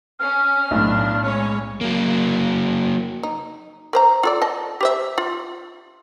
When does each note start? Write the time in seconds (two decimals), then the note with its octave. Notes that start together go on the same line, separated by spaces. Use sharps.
0.19 C#4 F6
0.71 B1 A2 D4
1.24 G#3 C#4 C#5
1.81 F#3 A#3
3.23 D#4
3.93 A#4 C5 A#5
4.23 F4 A4 D5
4.42 D#5 A5
4.81 G4 C5 E5
5.18 F4